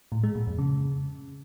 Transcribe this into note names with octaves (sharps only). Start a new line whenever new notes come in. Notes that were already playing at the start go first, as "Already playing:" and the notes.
A2
G#3
A#2
F2
C#3